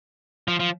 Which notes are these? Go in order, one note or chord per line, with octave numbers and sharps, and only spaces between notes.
F3
F3